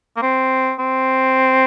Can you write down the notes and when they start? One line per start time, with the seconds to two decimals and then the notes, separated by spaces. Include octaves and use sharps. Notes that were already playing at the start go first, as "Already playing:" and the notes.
0.16 A#3
0.22 C4
0.79 C4